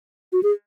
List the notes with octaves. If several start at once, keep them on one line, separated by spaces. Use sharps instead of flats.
F#4
G#4